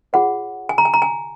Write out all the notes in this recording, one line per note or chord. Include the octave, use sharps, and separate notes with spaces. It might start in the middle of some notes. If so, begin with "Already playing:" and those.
F4 G#4 C#5 F#5
G#5
A#5
G#5
A#5
G#5